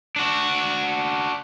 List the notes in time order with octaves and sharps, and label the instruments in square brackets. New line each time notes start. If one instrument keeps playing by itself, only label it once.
[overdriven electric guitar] D4 F#4